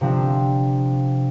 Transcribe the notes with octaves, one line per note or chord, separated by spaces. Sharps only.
C3 F3 C4 D4